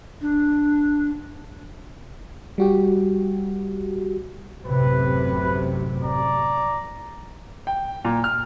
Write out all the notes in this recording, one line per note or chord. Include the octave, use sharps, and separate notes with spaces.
D4
G3 F#4 G4
A1 F#2 C3 B4
D5 A#5
G5
A#2
F6